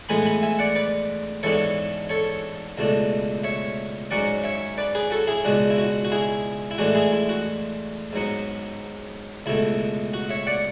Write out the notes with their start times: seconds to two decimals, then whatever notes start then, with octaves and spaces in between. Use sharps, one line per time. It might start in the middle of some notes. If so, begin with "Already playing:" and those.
0.09 A2 E3 G#3 B3 G#5 B5
0.25 G#5 B5
0.42 E5 G#5
0.59 D5 F#5
0.75 B4 D5
1.43 G#2 E3 B3 D4 A4 C#5
2.09 A4 C#5
2.78 C#2 B2 A3 D4
3.44 C#5 E5
4.11 G#2 F#3 C#4 D5 F#5
4.44 C#5 E5
4.78 B4 D5
4.95 G#4 B4
5.11 F#4 A4
5.27 E4 G#4
5.44 C#2 B2 G#3 D4 F#4
5.70 E4
5.78 F#4
6.05 F#4
6.12 E4 G#4
6.71 E4
6.78 A2 E3 G#3 D4 F#4
6.95 E4 G#4
7.13 E4
7.29 F#4
8.13 G#2 F#3 B3
9.46 C#2 B2 A3 E4
10.14 F#4
10.30 C#5 E5
10.47 D5 F#5